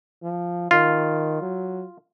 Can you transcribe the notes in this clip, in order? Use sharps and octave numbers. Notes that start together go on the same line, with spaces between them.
F3
D#3 F4
F#3